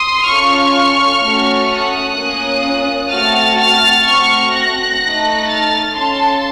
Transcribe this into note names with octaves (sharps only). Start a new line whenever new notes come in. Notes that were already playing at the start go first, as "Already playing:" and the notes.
Already playing: C6 D#6
C#4 F4 A4 C#6 F6
A3 C#4 F#4 A4
D#6 F#6
A#3 C#4 F4
A3 C4 F#4 A4 F6 A6
F6 A6
A3 C4 F#4 C#6 F6
F#6 A#6
A3 D#4 A4
F6 A6
C#4 F4 A4 A5 C6